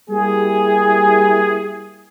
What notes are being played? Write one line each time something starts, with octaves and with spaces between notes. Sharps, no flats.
G3 A#3 E4 G4 G#4